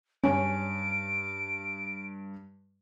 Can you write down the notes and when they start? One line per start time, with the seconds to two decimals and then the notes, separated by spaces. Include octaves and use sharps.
0.24 G2 C#4 D7